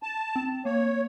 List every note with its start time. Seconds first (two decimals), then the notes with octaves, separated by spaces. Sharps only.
0.03 A5
0.36 C4
0.65 A#3 C#5